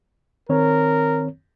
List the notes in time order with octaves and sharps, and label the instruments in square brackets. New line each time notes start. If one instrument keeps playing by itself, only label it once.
[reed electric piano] D#3 C4 C#5 [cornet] A#4